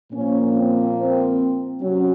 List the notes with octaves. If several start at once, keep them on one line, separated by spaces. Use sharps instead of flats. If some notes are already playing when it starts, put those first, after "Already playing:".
A#2 F3 A#3 C#4
C4
C4
C3 F#3 C#4